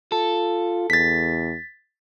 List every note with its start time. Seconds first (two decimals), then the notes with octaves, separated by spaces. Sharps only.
0.12 F4 A4
0.90 E2 A6 B6